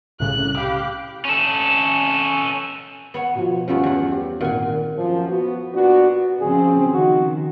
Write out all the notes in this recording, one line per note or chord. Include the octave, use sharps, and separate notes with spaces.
C2 A2 C#3 F#6
G4 F5 B5
C#4 A4
B3 C#5 G#5
B2 F3
G2 F3 A3 B3 C#4 F4
E2 F#5
G4
G#1 A#2 F#5 G#5
F#2 F3
B3 F#4
A#2 B3 D4 F#4
C#3 F3 C4 G#4
D#3 F#4